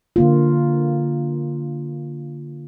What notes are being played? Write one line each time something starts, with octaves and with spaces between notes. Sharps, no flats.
D3 A#3 F4